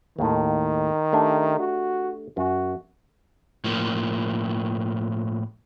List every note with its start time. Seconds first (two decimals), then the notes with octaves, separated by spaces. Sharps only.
0.19 D#2 A2 D#3
1.13 A3 D4 G4
1.59 F#4
2.37 F#2 F#4
3.64 A2 F3 A#3